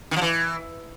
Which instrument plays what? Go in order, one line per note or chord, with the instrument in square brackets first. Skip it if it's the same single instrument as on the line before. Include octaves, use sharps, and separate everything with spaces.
[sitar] D#3
F3
E3